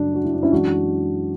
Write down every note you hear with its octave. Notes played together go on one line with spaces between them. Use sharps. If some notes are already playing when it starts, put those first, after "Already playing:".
Already playing: F#2 C#3 F#3 A3 D4
F#4
E4
D4
C#4 E4
F#2 E3 G#3 D4 F#4